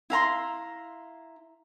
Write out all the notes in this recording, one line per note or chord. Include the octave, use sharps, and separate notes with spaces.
E4 F5 A#5 C6